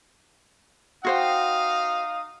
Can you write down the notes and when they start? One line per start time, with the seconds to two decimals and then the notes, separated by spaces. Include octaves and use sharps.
1.05 D#4 F#4 C5 F5 G5 D#6